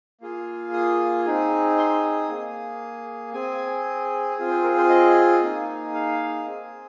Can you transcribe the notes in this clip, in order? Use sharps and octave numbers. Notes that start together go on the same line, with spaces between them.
A#3 F4 G#4
D#6
C4 D#4 G#4
C6
D#6
A#3 G#4
C4 G#4 G#5
C4 F4 G#4
C5
A#4
C5
D#5
A#3 D#4 G#4
F5
C4 G#4